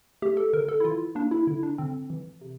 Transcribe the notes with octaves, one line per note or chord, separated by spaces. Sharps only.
A3 G4
A4
D3 A#4
A4
E4
E3 F4
A#3 D4
E4
D3 E4
D4
D3 C4
E3
C3